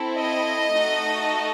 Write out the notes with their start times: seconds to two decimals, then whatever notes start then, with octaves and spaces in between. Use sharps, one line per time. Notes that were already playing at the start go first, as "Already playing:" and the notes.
Already playing: C4 E4 A4
0.16 D#5
0.73 A3 D#4 F#4 A4